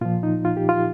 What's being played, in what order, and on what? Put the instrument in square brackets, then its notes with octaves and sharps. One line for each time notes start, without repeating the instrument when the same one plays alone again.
[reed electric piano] A#2 F3 F4
D#4
F4
G4
F4